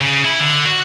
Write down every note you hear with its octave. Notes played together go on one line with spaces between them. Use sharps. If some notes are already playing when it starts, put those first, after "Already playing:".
C#3
E4
D3
F#4